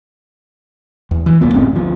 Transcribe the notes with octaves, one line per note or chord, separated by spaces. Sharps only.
E2
E3
D#1 C2 A#2 B3
F#1 A2 C#3 C4
D2 F3